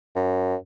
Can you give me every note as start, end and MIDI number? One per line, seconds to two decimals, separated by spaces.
0.16 0.55 42